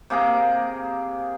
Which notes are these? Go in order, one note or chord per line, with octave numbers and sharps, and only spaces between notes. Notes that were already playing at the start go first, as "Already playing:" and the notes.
C3 A#3 G#4 A#5